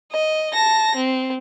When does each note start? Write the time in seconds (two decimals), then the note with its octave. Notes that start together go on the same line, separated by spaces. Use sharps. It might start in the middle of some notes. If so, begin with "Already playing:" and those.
0.12 D#5
0.54 A5 A#6
0.96 C4